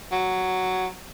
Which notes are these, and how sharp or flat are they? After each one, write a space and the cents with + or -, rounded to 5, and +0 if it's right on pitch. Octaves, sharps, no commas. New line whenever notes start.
F#3 +5